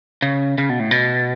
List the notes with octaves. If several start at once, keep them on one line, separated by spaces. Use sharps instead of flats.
C#3
C#3
B2
A2
B2